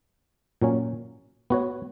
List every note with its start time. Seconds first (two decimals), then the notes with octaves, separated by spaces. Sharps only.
0.62 A#2 F#3 C#4
1.50 B3 F#4 C#5